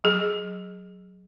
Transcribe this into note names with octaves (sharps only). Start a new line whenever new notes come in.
F#3 G#4